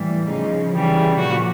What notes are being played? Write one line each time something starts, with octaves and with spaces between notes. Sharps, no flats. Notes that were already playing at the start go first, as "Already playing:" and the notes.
Already playing: A2 E3 G3
C#3 F3 D#4
C#3 E3 G3
A#2 F3 F#4